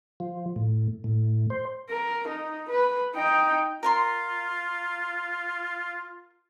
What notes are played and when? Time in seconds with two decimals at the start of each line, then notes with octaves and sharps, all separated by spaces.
0.20 F3
0.56 A2
1.04 A2
1.50 C5
1.90 A#4
2.27 D#4
2.69 B4
3.15 D#4 G5
3.83 F4 A#4 A#5 C6